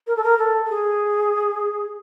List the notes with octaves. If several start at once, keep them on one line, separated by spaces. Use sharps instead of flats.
A#4
A4
A#4
A4
A4
G#4